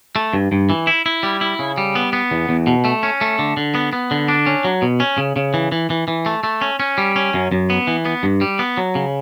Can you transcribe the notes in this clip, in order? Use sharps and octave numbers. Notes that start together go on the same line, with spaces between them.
A3
G2
G2
E3
E4
E4
G3
E4
C#3
G3
B3
B3
E2
E2
B2
A3
C#4
A3
D3
D3
B3
B3
D3
D4
C#4
F#3
B2
C#4
C#3
C#3
E3
E3
E3
E3
A3
A3
C#4
C#4
G3
C#4
F#2
F#2
B3
E3
B3
G2
G3
B3
F#3
C#3